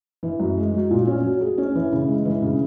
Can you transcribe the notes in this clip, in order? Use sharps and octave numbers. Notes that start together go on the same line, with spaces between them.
E3
F#2
G#3
F#3
A#2
C#4
F#3
G#4
C#4
E3
C#3
G#3
E3
C#3